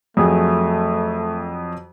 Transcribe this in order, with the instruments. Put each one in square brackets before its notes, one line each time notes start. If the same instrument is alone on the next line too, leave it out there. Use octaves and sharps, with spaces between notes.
[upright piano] F2 F#3 G#4 [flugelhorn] A3